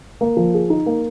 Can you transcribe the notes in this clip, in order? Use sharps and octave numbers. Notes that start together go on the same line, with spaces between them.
A#3
F3
G#4
D#4
A#3